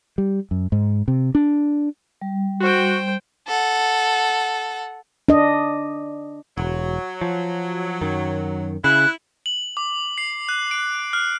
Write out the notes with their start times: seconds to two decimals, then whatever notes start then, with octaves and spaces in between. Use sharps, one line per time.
0.18 G3
0.51 F#2
0.72 G#2
1.08 C3
1.35 D4
2.22 G3
2.61 F#4 C5 G5
3.46 A4 F#5
5.28 D4 D#5
6.58 E1 F#3
7.21 F3
8.01 F#2 D#3
8.84 C#3 E4 F#6
9.46 F#7
9.77 D6
10.18 C7
10.49 F#6
10.71 D7
11.13 F6